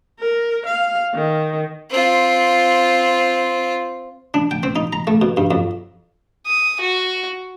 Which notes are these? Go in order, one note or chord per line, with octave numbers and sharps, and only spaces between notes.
A#4
F5
D#3
C4 F4
D4
G5
C4
D#4
A#5
A3
B2
G2
F2
D#6
F#4